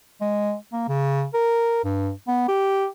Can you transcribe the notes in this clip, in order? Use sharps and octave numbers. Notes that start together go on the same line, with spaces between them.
G#3
A#3
C#3
A#4
G2
B3
G4